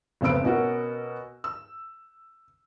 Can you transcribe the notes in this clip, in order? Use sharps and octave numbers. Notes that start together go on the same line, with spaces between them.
F1 C#3 B3 C5 E6 D7
B2 C#4 F#4 A#4
E6